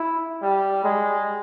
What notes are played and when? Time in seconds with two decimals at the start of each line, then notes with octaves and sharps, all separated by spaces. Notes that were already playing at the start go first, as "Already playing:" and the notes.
Already playing: E4
0.42 G3
0.84 G#3